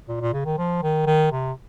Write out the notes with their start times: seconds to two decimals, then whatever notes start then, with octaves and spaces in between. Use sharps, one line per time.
0.08 A#2
0.21 A#2
0.33 C#3
0.45 D#3
0.58 F3
0.82 D#3
1.06 D#3
1.32 C3